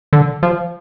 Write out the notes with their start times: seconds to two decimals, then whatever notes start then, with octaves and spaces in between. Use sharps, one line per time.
0.13 D3
0.43 F3